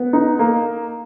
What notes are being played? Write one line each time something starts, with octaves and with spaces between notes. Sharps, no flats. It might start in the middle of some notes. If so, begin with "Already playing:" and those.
Already playing: B3
D#4
A#3